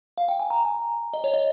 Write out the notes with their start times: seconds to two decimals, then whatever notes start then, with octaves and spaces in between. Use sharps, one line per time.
0.18 F5
0.29 G5
0.40 G#5
0.50 A#5
0.65 G#5
1.14 D#5
1.24 C#5
1.34 D#5